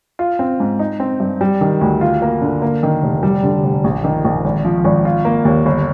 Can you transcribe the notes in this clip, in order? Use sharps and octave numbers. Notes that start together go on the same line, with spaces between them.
F4
C4
G#2
D#4
C4
G2
G3
D#3
D2
F4
A#3
D3
A#3
D#3
F1
G3
D3
F1
A#1
D#3
A#1
G#1
F3
G#1
F4
A#3
D#2
G1